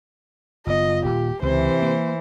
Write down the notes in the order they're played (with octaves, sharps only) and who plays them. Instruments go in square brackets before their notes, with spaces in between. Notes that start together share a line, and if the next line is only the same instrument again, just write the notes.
[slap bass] F#1 B3 [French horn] F4 [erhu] D#5
[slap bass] D#1 A#2 [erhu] G4
[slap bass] C#2 [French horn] C3 [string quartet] E3 [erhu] C5
[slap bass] A#3